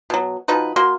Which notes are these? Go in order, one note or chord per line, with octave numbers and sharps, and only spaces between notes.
B2 F#3
F3 D#4 F#4 B4
A#3 F#4 C6